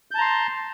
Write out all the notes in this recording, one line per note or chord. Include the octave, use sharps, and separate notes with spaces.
A5 A#5 C6 G6